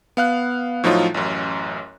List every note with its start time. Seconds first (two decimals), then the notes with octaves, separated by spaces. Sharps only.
0.17 B3 F5 F#6
0.84 A2 F3 F#3 D#4 F4
1.14 A1 F#2